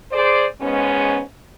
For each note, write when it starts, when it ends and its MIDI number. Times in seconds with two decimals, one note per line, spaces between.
0.11 0.45 68
0.11 0.45 72
0.11 0.45 74
0.61 1.21 44
0.61 1.21 56
0.61 1.21 59
0.61 1.21 61